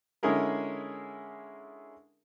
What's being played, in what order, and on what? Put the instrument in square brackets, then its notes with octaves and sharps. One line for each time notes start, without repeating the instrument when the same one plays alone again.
[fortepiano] D3 G#3 C#4 E4 G#4 A#4